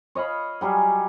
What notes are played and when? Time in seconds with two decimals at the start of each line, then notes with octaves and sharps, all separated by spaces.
0.15 C#5 D#5 F5 B5
0.61 F#3 G3 G#4